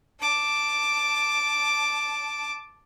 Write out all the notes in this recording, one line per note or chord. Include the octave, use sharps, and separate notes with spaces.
A5 D6